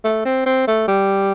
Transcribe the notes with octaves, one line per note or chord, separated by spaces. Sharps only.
A3
C4
C4
A3
G3